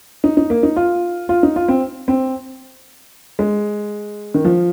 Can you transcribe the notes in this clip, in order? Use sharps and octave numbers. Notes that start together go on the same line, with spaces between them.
D#4
D#4
A#3
D#4
F4
F4
D#4
F4
C4
C4
G#3
D#3
F3